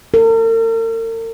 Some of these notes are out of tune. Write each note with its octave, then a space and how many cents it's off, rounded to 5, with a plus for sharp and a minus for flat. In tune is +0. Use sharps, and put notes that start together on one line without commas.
A#4 -45